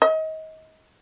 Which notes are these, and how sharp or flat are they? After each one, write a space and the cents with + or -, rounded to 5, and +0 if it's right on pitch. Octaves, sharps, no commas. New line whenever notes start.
D#5 +30